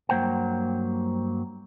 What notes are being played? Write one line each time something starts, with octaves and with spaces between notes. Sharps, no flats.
G2 F#3 A#3 C5 F#5 G5